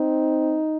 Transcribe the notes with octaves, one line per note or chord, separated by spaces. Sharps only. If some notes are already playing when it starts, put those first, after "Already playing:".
Already playing: C4 D#4